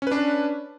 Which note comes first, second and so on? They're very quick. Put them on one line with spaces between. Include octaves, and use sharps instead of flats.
C#4 B4 D4